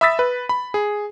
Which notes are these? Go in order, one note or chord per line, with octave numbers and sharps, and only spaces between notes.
E5 B5 D#6 E6 A6 B6
B4
B5
G#4